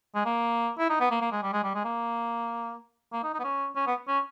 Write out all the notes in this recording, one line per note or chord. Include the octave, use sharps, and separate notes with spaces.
G#3
A#3
E4
D#4
B3
A#3
A#3
G#3
G3
G#3
G3
G#3
A#3
A#3
D#4
D#4
B3
C#4
C#4
B3
C#4